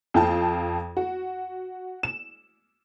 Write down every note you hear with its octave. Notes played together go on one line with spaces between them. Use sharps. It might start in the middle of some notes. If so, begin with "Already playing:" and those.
F2 F4 G5 A5
F#4
E7